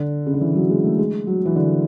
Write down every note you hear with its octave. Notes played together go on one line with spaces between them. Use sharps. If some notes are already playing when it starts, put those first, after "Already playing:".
Already playing: D3
C#3
D3
E3
F#3
G#3
A3
G#3
F#3
E3
D3